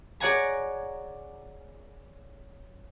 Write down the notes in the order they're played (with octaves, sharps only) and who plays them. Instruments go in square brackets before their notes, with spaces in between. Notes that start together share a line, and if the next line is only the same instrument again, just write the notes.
[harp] G#4 C#5 D5 F#5 G#5 A#5